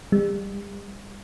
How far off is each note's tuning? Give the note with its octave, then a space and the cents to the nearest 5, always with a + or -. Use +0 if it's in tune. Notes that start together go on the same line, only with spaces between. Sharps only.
G3 +40